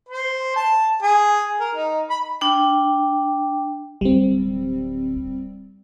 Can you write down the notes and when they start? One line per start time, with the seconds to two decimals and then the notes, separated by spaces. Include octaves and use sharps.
0.09 C5
0.56 A5
1.02 G#4
1.60 A#4
1.75 D#4
2.10 B5
2.41 D4 G5
4.01 D1 G3 C4